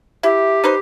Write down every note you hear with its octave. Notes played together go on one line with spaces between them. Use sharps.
E4 G4
D#4 B4 C5